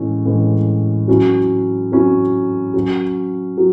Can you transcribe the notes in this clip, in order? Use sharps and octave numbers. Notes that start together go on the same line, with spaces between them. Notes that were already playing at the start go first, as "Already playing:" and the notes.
Already playing: A2 E3 G#3 C#4
A2 E3 G#3 C#4
F#3 C#4 E4
F#3 C#4 E4
F#3 C#4 F#4
F#3